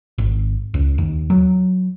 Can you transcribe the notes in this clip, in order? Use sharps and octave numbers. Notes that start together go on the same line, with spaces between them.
G#1
C#2
D#2
F#3